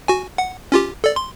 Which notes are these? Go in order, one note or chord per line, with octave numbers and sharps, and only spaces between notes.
F#4 G#5
F#5
C#4 F4 G4
A4 D5
C6